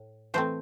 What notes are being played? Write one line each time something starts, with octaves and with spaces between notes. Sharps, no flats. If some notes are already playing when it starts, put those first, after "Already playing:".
Already playing: A2
E3 A3 C4 C5